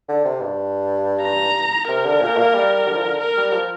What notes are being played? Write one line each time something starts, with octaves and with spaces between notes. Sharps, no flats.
D3
C3
G2
A#5
C3 A#4
D3
A#2
A#3
G3
D3
F3
D3
A#4
G3
F3